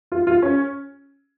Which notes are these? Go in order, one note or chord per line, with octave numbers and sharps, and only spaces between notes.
F4
F4
C#4